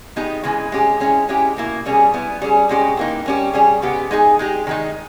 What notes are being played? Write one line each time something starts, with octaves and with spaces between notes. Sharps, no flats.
G#3 B3 D#4 G4
C#3 E3 G#3
G#3 C#4 G4
G#3 C#4 E4
G#3 C#4 E4 G4
B2 A#3 E4
B2 G3 C#4 G#4
G3 B3 E4
G3 C#4 G#4
B2 G#3 C#4 G4
E3 A#3 D#4
G3 C#4 G4
G3 C#4 G#4
C#3 G#3 B3 G4
G#3 D#4 G#4
G#3 D#4 G4
D#3 G#3 D#4